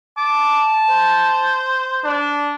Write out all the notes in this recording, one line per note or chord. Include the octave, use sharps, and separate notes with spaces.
A5 D6
C5
D4